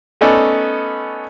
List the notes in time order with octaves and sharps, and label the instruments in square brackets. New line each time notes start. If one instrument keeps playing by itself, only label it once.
[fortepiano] A3 B3 C#4 D#4 A4 D5